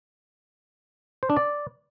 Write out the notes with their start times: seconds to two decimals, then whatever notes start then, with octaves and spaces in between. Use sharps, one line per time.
1.23 C5
1.30 D4
1.37 D5